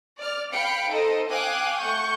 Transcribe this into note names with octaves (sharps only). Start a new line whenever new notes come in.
D5 F6
F5 G5 B5 C#7 D7
D#4 A4 C5 D#5
F5 G5 G#5 D6 D#6 F#6
A3 F#5 C#6 G6